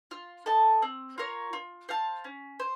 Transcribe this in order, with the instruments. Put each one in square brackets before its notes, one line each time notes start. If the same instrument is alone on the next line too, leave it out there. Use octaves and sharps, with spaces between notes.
[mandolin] F4
A4 D#5 A5
C4
F4 A#4 C#5
F4
C5 F5 A5
C#4
C5